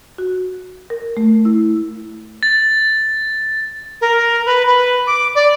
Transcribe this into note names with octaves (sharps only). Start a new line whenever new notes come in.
F#4
A#4
A3
E4
A6
A#4
B4
B4
D6
D5